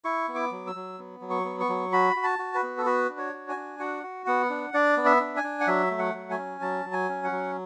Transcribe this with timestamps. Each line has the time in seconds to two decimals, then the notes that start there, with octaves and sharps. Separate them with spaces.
0.05 E4 C#6
0.28 B3
0.35 D6
0.51 F#3
0.67 E6
0.75 F#3
0.99 B3
1.21 F#3
1.30 C#6
1.45 B3
1.60 C#6
1.69 F#3
1.93 F#4 B5
2.16 F#4
2.24 A5
2.39 F#4
2.55 B4
2.63 B3
2.78 A4
2.86 F#4 B4
3.09 D4
3.18 C#5
3.33 F#4
3.49 G#5
3.56 D4
3.80 F#4 F#5
4.03 F#4
4.26 B3 F#5
4.50 D4
4.74 D4 D5
4.97 B3
5.05 E5
5.20 D4
5.37 G#5
5.44 D4
5.61 F#5
5.67 F#3 E5
5.91 A3
5.99 F#5
6.14 F#3
6.30 G#5
6.38 C#4
6.61 F#3 A5
6.85 F#3
6.93 G#5
7.09 C#4
7.24 F#5
7.31 F#3